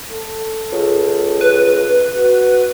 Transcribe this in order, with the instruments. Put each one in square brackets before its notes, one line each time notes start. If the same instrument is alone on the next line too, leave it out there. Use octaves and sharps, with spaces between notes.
[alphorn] A4
[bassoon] C#2
[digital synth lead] B4
[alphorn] F#4